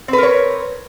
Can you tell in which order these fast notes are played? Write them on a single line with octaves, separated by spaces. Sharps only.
C4 B4 A#4 C#5